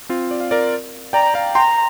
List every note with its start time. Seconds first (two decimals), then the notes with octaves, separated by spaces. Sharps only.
0.09 C4 F4
0.31 D5
0.40 F5
0.51 A#4 D5
1.13 D5 G5 A#5
1.34 F5 A#5
1.55 G5 A#5 C6